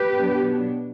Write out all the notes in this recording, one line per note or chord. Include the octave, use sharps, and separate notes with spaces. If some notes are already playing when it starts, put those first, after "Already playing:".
Already playing: G4 B4
B2 F#3 B3 D4